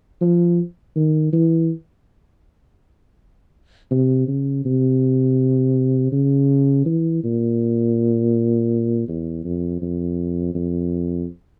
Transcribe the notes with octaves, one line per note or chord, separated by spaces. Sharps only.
F3
D#3
E3
C3
C#3
C3
C#3
E3
A#2
E2
F2
F2
F2